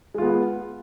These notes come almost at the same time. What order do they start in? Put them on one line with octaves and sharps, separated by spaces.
G#3 F4 B3